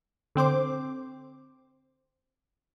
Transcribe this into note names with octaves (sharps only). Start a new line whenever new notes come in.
D3 C4 C5 D6